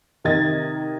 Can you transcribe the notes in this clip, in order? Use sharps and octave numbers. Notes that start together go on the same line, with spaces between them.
C3 D#3 D#5 G#6 A6